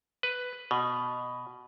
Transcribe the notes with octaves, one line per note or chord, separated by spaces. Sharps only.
B4
B2